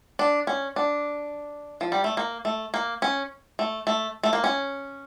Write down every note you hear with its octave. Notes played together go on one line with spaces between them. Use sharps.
D4
C#4
D4
F3
G3
A3
A#3
A3
A#3
C#4
A3
A3
A3
A#3
C#4